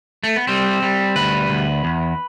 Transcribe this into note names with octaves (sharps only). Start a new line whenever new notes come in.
A3
B3
G3 C4
G3
D2 B4
D2
E2